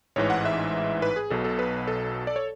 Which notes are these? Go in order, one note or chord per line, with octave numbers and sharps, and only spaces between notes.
A1 G#2 E3 C#5
F#5
E5
B4
G#4
B1 B2 F#3 A4
A4
B4
A4
D5
C#5